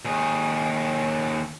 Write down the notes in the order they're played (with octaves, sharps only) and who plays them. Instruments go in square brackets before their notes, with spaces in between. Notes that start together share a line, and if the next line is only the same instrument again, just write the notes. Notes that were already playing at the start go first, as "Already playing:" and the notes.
[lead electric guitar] D#2 G#4